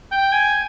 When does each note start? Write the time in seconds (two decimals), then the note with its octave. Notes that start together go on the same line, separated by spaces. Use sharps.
0.11 G5
0.33 G#5